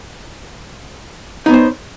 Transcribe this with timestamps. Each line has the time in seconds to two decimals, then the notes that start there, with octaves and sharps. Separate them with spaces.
1.46 D#4
1.49 B3
1.51 C#5
1.54 C5